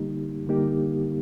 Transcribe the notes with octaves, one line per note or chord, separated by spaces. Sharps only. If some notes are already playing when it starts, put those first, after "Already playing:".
Already playing: D3 G3 A#3 D#4 G4
D3 G3 A#3 D#4 G4